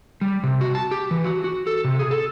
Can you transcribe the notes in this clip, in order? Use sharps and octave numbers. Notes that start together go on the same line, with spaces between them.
G3
C3
F#4
A5
G4
E3
F#4
F#4
A4
C3
G#4
A4